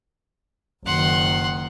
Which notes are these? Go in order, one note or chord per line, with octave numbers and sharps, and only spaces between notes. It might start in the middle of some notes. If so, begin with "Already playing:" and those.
F#1 D#3 F#5 C6